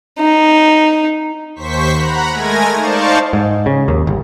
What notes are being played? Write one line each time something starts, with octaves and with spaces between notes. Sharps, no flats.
D#4
D#2 C5 C#6 B6
F#5 A#5 B5
G#3 A3 A#4 G#5 G#6 A#6
D#4 C5 D5 F5 A5 C#6
G#2
C#3
D#2
G1